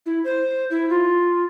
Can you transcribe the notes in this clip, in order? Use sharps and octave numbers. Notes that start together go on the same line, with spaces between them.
E4
C5
E4
F4